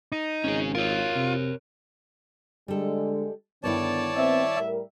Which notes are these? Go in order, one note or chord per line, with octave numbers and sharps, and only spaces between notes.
D#4
G#1 C#4 G#4
F4 A#4 C#5
C3
D3 G3 G#3 A4
G2 D3 D#3 B3 E4 C#5 D5 A5
B3 C4 E5
A2 G3 A#4